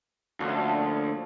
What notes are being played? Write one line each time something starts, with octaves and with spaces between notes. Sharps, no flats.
D2 A#2 F3 C#4